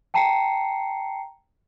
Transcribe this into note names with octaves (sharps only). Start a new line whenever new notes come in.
G5 A5 A#5 C7 C#7